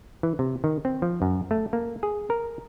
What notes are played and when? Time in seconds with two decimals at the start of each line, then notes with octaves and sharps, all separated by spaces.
0.23 E3
0.39 C3
0.64 D#3
0.85 C4
1.02 F3
1.22 F#2
1.51 A3
1.73 A#3
2.03 G#4
2.30 A#4